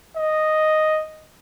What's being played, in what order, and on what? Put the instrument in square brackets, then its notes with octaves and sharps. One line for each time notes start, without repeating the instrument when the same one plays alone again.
[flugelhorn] D#5